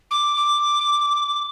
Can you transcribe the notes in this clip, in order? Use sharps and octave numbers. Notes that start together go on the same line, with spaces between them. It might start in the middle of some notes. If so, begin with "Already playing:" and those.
D6
D6